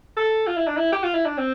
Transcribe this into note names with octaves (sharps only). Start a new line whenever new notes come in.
A4
F4
E4
D4
E4
G4
F4
E4
D4
C4